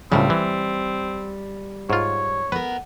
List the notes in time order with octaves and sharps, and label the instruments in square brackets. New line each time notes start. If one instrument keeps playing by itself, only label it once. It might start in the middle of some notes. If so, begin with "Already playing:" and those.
[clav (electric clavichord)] C#2 A2 C#3 [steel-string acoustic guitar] G3 [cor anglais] C4
[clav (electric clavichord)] E3
[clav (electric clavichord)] G#2 F4 [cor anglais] C#5
[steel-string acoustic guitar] B3 A#4 [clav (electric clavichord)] B4